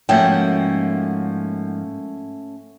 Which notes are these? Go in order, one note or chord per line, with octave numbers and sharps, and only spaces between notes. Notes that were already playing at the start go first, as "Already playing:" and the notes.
G#2 F3 A3 A#3 C#4 F#4 F#5 G5